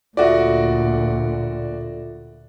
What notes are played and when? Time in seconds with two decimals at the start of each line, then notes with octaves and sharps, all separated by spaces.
0.17 D2 A#2 F4 F#4 A4 D5 E5